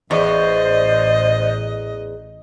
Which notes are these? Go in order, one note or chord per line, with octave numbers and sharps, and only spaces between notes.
A1 E2 C5 D5 D#5